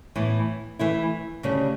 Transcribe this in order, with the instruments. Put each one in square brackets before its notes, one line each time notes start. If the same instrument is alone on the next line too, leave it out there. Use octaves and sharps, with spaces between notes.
[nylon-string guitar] A2 E3 B3
E3 A3 E4
D2 C#3 G3